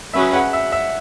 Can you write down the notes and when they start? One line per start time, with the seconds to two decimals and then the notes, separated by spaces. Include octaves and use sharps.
0.13 F#3 C#4 G#4 B4 E5
0.33 F#5
0.53 E5
0.72 E5